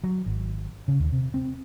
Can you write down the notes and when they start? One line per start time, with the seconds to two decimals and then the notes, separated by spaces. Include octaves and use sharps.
0.04 F#3
0.26 G#1
0.88 C#3
1.00 D#2
1.12 C3
1.34 C4